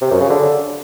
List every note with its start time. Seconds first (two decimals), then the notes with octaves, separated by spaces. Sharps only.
0.01 C3
0.11 F#2
0.20 C#3
0.30 D3